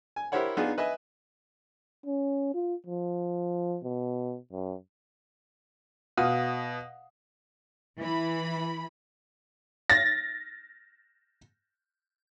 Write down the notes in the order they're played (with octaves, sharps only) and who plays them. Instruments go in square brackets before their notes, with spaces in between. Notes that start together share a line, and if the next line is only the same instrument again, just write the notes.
[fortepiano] G#5
E4 G4 A#4 C5 C#5 F#5
B3 D4 D#4 F4 G#4
B4 D#5 E5 G#5
[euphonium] C#4
F4
F3
B2
F#2
[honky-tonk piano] B2 [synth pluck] F5 F#5 D#6
[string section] E3 B5
[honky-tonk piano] A6 A#6